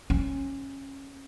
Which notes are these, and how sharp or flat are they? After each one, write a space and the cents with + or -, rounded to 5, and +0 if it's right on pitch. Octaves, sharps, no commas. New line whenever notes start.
C#4 -20